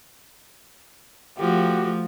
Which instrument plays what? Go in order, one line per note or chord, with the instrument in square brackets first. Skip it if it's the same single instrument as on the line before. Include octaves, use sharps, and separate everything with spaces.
[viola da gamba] F3 A3 [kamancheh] F#4 G4